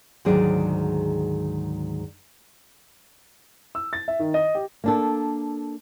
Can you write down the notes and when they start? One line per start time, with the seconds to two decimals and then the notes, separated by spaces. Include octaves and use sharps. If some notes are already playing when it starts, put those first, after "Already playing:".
0.25 D2 G#2 D#3 F#3 G#4 D5
3.75 E6
3.93 A6
4.08 E5
4.19 D#3
4.34 D#5
4.55 G4
4.84 A#3 D4 A4